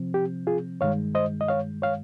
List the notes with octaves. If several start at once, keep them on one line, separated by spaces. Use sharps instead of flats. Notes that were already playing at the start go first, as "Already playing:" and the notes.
Already playing: C3 F3 C4
G4
F4 G#4
G2 D#3 G#3 C#5 F5
C5 D#5
D#5
C#5 F5
C#5 F5